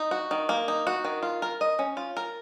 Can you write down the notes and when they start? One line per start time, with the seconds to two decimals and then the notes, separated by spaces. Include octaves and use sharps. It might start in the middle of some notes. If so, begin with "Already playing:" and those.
Already playing: D#4
0.11 F#4
0.31 D#3
0.49 A#3
0.68 D#4
0.87 F#4
1.04 D#3
1.23 F4
1.42 A#4
1.61 D#5
1.79 C#4
1.97 F4
2.17 A#4